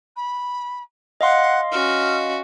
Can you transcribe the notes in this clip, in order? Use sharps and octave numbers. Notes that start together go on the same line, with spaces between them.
B5
D#5 F5 F#5 C6
C#4 F#4 F6